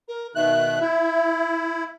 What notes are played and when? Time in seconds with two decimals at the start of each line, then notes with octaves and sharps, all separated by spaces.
0.08 A#4
0.35 B2 D#3 E5 F#6
0.81 E4